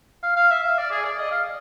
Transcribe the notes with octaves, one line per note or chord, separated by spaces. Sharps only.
F5
F5
E5
F5
D5
G#4
D5
D#5
F5